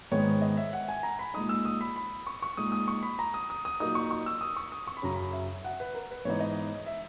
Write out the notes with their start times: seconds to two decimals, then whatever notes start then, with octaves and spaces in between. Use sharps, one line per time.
0.11 G#2 D#3 G#3 B3 C#5
0.42 D#5
0.57 E5
0.73 F#5
0.88 G#5
1.03 A#5
1.19 B5
1.34 A#2 G#3 D#4 D#6
1.49 E6
1.65 D#6
1.81 B5
1.96 B5
2.27 C#6
2.42 C#6
2.57 A#2 G#3 D#4 D#6
2.72 D#6
2.88 C#6
3.03 B5
3.19 A#5
3.34 D#6
3.50 D#6
3.65 D#6
3.80 A#2 F#3 A#3 D#4 D#6
3.95 C#6
4.11 C#6
4.26 E6
4.41 D#6
4.56 C#6
4.72 D#6
4.87 C#6
4.97 B5
5.02 F#2 C#3 F#3 C#4 A#5
5.14 B5
5.33 E5
5.65 F#5
5.80 B4
5.95 A#4
6.11 B4
6.25 G#2 E3 B3 D#4 C#5
6.41 D#5
6.86 E5